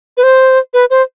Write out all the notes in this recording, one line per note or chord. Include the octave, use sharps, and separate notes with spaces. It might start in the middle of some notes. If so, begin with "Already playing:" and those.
B4
C5
B4
C5